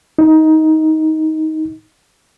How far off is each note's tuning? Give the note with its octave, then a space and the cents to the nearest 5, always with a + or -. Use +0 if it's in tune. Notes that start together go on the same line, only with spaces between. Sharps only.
D#4 +15